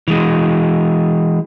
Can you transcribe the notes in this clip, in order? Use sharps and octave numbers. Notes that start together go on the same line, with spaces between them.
E3 G#3